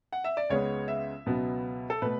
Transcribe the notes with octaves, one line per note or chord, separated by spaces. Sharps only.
F#5
E5
D5
C#2 C#3 G#3 B3 C#5
E5
C#2 B2 F#3 B3
A4
B2 A3 B4